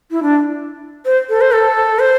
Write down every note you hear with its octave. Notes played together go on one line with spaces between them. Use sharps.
E4
D4
C5
A4
C5
A4
C5